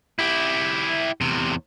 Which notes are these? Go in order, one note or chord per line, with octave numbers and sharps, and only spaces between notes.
E4 G4
E2 C3